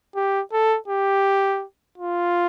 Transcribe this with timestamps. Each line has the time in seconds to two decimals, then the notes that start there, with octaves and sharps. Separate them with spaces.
0.16 G4
0.52 A4
0.88 G4
1.98 F4